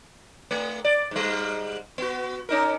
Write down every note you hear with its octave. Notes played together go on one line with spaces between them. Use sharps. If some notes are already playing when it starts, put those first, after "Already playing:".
A3
D5
G#2 G3
B3 F#4
C#4 D#4 A#4